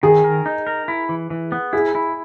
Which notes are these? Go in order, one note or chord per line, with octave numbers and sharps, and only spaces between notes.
D#3 G#4
A#4
D#4
A#4
E4
E3
E3
B3
E4 G#4
E4